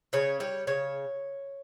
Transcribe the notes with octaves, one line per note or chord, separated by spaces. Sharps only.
C#3 C#5
G3 C#5
C#3 C#5